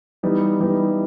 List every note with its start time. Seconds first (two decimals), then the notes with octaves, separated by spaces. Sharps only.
0.23 E3 G3 B3 D#4
0.59 E3 G3 B3 D#4